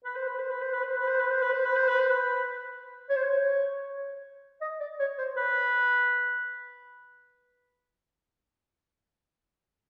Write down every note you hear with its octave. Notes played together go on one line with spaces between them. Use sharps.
B4
C5
B4
C5
B4
C5
B4
C5
B4
C5
B4
C5
B4
C5
B4
C5
B4
C5
B4
C#5
C5
C#5
D#5
D5
C#5
C5
B4